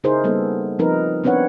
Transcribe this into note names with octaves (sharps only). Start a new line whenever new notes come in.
C#3 D#4 E4 G#4 A#4 C5
G3 A#3 B3 A4
F3 C4 D#4 A#4 B4
B3 C4 D4 B4 C#5 F#5